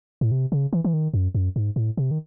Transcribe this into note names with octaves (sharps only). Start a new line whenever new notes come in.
A2
C3
C#3
E3
E3
D#3
F#2
F#2
G#2
A2
C3
D#3